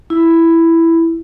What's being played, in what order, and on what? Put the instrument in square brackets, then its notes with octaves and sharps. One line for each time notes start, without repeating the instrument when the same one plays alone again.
[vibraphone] E4